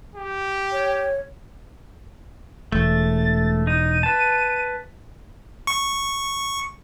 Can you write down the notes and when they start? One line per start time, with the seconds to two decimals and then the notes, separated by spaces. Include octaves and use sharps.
0.15 G4
0.72 C#5
2.72 E1 A3 A6
3.67 D#4 D#7
4.03 B4 A5
5.67 C#6